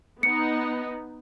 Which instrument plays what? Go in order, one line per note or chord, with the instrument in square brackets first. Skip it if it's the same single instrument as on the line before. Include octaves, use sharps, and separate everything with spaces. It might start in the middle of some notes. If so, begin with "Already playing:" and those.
[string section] B3 D#4 [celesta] C#7